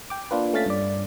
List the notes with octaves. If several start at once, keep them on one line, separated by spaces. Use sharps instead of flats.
G5 D6
A#3 D4 F4 B4
A3 C#4 F5 A6 B6
G2 D5